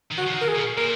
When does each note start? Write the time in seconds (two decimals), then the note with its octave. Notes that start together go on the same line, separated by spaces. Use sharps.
0.11 D#3
0.18 F#4
0.27 F3
0.33 D#3
0.41 A#4
0.48 G#4
0.55 B2
0.77 A#2 A#4